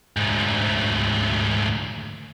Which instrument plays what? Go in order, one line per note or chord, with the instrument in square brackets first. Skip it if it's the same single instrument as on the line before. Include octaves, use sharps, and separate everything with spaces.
[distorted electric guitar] D2 G#2